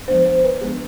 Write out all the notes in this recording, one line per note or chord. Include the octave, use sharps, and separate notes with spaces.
F3 G#3 B3 D4 C5
C5
B4
F3 G#3 B3 D4 G#4